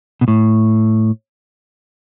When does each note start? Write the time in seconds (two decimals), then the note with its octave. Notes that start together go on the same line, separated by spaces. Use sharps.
0.21 B2
0.28 A2